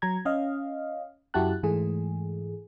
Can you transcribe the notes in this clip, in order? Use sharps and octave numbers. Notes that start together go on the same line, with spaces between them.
F#3 A#5 G#6
C#4 D#5 F5
F#2 E4 F#4 G4 A5 F#6
G#2 E3 G#3 A3 G#4